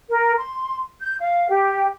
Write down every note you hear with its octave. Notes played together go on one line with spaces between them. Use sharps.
A#4
C6
G6
F5
G4